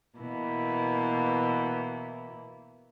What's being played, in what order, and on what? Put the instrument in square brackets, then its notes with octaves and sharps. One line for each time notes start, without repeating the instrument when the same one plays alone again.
[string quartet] B2 E3 A#3 E4